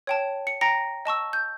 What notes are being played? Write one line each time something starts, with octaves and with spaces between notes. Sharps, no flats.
C#5 G5 A5
C#7
G5 A#5 A#6 C#7
D#5 A5 C#6 E6
G6